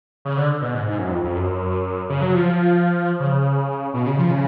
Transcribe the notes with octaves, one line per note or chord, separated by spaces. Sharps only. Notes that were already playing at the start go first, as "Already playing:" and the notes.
C#3
D3
B2
G#2
G#2
F#2
F2
F2
F#2
C#3
F#3
F3
C#3
B2
C#3
F3
C#3